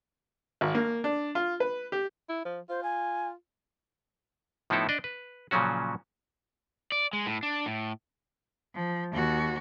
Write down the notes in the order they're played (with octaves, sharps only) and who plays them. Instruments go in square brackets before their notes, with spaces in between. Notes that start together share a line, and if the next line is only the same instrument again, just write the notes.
[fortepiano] G#1
A#3
D4
F4
B4
G4
[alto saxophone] E4
F3
[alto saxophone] F4 [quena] C5
[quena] G#5
[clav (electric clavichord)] A2 F3 B3 D#4 E4 A4
D4 D5 D#5
B4
A#2 C#3 F3 F#3 C#4 F#4
[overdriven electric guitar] D5
G#3
A2
D4
A2
[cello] F3
D#2 F#4